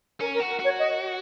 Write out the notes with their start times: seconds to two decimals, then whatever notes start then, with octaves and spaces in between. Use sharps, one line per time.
0.21 C#4 A#4
0.34 A#4
0.40 F#4
0.49 A#4
0.60 F#4 C#5
0.79 D#5